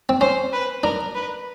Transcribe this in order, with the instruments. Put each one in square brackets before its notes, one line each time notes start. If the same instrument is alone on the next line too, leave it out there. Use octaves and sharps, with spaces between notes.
[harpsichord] C4
[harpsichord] C#4 [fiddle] C5
[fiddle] B4
[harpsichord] D4 [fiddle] A#4
[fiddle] B4